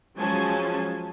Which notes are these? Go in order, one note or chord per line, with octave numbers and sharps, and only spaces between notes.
F3 F#3 G#3 C#4 G#5 A5